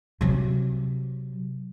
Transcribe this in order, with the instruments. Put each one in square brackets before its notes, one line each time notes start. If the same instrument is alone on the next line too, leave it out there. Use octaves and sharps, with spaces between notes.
[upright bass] C3 F#3